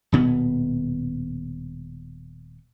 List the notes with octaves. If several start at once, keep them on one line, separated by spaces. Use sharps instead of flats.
D#1 B2 B3